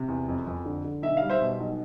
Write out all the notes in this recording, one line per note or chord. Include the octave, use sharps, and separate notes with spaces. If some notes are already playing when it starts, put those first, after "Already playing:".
Already playing: C3
E2
F2
F2
D3
D3
B1 E5
G3 F5
C5 E5
B2
B1